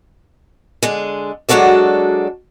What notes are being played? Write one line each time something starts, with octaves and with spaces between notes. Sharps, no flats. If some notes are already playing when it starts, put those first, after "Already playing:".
D3 G#3
F#3 G#3 D4 F#4 A4 D5